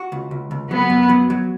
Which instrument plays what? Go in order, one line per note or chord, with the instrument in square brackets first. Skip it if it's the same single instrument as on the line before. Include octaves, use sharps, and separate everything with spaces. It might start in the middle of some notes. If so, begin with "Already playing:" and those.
Already playing: [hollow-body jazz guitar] F#4
C#2
C#2
C#2
[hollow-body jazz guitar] F#3 [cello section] B3
[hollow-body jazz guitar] F#2
F#3
F#3